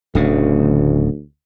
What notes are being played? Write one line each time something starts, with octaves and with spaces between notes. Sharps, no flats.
D1 D2 C#3